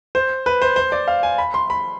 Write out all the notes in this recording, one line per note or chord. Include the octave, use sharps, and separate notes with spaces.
C5
B4
C5
C5
D5
F5
G#5
B5
C6
B5